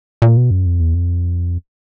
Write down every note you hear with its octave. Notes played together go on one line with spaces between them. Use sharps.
A#2
B2
F#2
F2
E2
F2